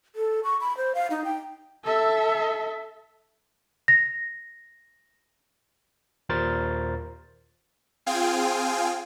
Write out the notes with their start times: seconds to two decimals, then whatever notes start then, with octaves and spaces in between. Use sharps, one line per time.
0.16 A4
0.44 C#6
0.61 B5
0.77 C5
0.95 F5
1.10 D#4
1.25 G5
1.84 A4 E5
3.88 A#6
6.29 D#2 A#2 A#4 C5 A6
8.06 C4 F4 G#4 F5 G5 G#5